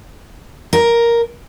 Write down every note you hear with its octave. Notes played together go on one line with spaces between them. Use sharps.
A#4